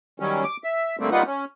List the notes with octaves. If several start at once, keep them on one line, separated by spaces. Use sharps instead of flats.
D#3 F#3 G3 C#4
D6
E5
D3 G3 A3 A#3 C4
G3 A#3 D#4 F4 B4 F#5
C#4